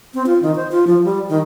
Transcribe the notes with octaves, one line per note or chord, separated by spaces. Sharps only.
C4
F4
D#3
C5
F4
F3
G3
D#3